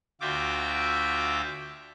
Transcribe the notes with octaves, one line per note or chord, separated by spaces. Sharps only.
D2 F4 F#4 E5 G5 D6